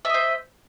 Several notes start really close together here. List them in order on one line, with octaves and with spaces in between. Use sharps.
E5 D#5 C5